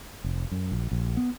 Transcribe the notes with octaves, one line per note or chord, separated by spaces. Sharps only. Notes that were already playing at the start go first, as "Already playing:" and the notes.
F1
F#2
A#1
A#1
B3